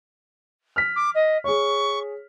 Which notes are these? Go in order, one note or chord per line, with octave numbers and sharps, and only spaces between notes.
F6 B6
D6
D#5
G#4 C#5 C#6